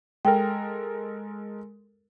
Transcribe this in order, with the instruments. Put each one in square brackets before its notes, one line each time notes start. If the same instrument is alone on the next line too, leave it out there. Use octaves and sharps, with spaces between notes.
[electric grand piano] G#3 A4 A#4 [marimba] G5